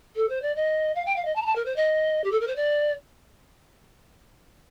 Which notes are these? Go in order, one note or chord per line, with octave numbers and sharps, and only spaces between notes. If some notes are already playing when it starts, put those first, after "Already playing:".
A4
C5
D5
D#5
F5
G5
F5
D#5
A5
A#5
A5
A#4
C5
D#5
G4
A4
A#4
C5
D5